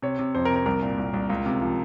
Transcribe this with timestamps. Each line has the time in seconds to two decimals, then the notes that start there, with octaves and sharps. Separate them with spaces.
0.02 C3 C#5
0.19 C3
0.35 F2 C5
0.45 A#4
0.50 C3
0.56 A#4
0.66 C2 A#4
0.82 A#2
0.98 C2
1.14 C2
1.30 C#2
1.46 C3
1.62 F3